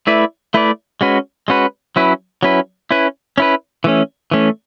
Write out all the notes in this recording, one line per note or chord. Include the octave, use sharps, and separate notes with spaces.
A3 E4 B4 D5
A3 E4 B4 D5
G#3 C#4 F#4 B4
G#3 C#4 F#4 B4
F#3 C#4 E4 B4
F#3 C#4 E4 B4
C#4 E4 B4
C#4 E4 B4
E3 A3 C#4
E3 A3 C#4